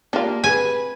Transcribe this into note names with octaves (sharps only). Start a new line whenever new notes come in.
A#3 D4 F4 G4
C4 G#4 B4 G#5